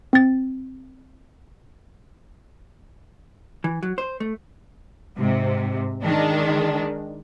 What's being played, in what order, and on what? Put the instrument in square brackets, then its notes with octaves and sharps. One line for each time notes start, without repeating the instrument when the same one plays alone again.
[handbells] C4 A6
[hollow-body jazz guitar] E3
F#3
C5
A3
[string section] G#2 C3
D#3 G#3 D4